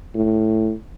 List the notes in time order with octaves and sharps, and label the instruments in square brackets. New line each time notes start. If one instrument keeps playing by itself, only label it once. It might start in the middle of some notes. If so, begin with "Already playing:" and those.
[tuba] A2